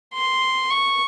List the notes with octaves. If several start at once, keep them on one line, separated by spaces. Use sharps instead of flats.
C6
C#6